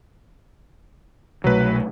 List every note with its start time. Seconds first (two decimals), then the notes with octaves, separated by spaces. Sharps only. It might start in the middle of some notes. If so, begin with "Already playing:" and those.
1.44 C2 B2 F#3 A3 B4